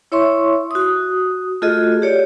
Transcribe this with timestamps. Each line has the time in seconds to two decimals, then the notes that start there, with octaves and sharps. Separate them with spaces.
0.12 E4 C#5 E5 C6 C#6
0.71 F#4 D#6
1.62 A3 F4 F#4 G#4 A4 D#5
2.02 G4 C#5 D5